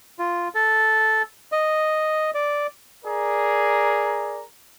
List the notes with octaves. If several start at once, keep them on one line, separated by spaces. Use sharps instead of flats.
F4
A4
D#5
D5
G#4 A#4 D5 A#5